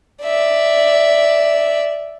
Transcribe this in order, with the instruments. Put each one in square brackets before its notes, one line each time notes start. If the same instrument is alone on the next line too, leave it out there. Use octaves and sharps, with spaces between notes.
[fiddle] D5 E5